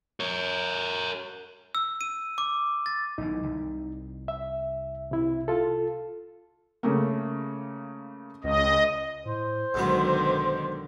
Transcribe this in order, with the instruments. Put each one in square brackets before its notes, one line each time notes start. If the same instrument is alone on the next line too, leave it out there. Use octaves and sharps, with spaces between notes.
[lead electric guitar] A#4 C#5
[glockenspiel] E6
D#7
D6
A6
[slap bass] B1 B2 E3 [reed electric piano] D#4
[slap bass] C2
[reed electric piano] E5
C3 E4
F4 A4
[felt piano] C#3 A3 A#3
[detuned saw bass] C#2 [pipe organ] D#5
[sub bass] A2 [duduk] C5
[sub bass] B1 [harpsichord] G#2 F#3 B4 [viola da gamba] B2 D3 D#3